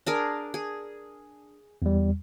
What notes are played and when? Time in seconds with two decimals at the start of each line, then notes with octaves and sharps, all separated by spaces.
0.07 D4 G#4 A#4
0.54 G#4
1.82 E2 G3